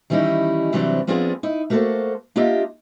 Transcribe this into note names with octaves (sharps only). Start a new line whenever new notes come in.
D#3 E3 G3 C#4 D#4 E4
C3 E3 F#3 G3 C4 D4
F3 B3 C4 D4 F4 G#4
D#4 E4
A3 A#3 F#4 G4 A4 C5
A#3 D4 F4 G4 D#5 E5